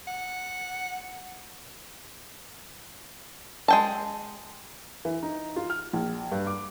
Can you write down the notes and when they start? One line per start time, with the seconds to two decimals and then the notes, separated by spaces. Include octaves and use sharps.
0.08 F#5
3.68 G#3 G5 A5
5.05 E3
5.23 D#4
5.56 F4
5.70 F6
5.93 A#1
6.32 G2
6.47 D6